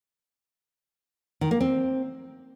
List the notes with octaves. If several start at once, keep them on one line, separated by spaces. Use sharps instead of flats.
D#3
A#3
C4